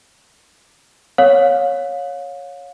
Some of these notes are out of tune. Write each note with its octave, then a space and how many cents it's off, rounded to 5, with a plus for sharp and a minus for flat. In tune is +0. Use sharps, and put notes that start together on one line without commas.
C#5 +0 F5 +30